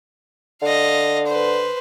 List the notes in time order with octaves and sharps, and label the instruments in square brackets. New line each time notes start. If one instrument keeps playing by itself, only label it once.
[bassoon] D3 [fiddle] D#5 F5
[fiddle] B4 C5